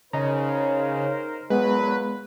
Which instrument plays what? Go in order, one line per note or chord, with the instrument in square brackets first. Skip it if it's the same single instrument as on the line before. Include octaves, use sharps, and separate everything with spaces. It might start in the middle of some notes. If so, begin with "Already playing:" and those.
[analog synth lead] C#3 [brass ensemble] D#4 A#4 C5 [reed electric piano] D#5 A#5
[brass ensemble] A#2 F#3 [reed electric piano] G#3 B3 [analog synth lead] B4